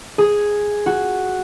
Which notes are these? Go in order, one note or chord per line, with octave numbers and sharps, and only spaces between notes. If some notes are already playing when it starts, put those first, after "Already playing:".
G#4
F#4